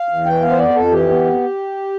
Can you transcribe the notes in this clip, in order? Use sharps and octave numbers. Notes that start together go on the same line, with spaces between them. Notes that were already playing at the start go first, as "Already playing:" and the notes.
Already playing: F5
E2
E3 G5
B3 F5
C5
F2 D5
F2 A4
E3 G4
B3
F2